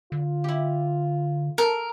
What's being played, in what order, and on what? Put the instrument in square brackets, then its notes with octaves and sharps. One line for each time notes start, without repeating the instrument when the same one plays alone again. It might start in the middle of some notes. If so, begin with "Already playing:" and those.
[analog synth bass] D3 [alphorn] F4
[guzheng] E4 G4
[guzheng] A4 [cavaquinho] A#4